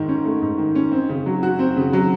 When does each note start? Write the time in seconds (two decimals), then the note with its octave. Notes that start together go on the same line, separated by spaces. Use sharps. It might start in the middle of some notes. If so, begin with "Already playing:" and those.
Already playing: G#2 D#3
0.08 C#4
0.25 A3
0.41 G#2
0.58 D#3
0.75 C#4
0.92 C4
1.09 C#3
1.26 F#3
1.43 F#4
1.59 C4
1.77 C#3
1.93 F#3